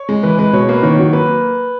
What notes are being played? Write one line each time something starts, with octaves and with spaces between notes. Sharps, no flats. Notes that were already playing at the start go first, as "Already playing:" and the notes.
Already playing: C#5
G#3
E3 B4
G#3 B4
B2 C#5
A#3 B4
D#3 C#5
F#3
A#3 B4